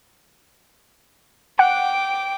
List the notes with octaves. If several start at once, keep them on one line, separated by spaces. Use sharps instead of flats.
F#5 G5 D6